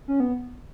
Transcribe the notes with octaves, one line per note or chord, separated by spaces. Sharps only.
C#4
B3